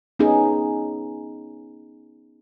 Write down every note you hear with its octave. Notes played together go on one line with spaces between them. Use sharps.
B3 C#4 D#4 G#4